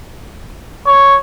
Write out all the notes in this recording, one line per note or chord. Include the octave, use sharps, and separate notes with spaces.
C#5